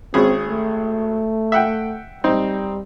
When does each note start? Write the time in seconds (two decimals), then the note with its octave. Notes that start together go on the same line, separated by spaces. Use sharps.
0.14 G#1 C4 C#4 G#4
0.46 A3
1.52 E5 F#5 G5
2.24 G3 C4 D#4